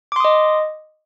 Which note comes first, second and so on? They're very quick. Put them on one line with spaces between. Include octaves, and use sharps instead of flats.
D6 C6 D#6 D#5